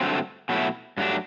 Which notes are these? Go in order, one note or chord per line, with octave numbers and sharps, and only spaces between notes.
G2 D3 F#3 A3 C4
B2 F#3 A3 E4
G2 F#3 A3 D4